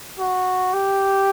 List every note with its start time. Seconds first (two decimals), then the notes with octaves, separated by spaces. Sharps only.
0.19 F#4
0.73 G4